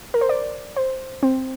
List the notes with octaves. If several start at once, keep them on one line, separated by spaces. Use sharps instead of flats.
A#4
C5
D5
C5
C4